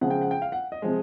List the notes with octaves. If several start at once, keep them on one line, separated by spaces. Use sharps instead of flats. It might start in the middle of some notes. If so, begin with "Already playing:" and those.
C#3 F3 G#3 F#5
G5
F#5
G5
F5
F#5
D#5
C3 F3 G#3